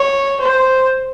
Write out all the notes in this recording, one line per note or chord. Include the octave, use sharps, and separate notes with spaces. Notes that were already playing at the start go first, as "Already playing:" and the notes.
Already playing: C#5
C5